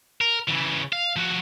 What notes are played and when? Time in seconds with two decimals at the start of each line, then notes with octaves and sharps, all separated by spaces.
0.21 A#4
0.48 C#3 E3
0.93 F5
1.16 F3 F#4